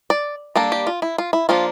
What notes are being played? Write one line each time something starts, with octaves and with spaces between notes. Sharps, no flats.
D5
G3 A#3 D4 A4
G4
F4
E4
F4
E4
F3 A#3 D4 F4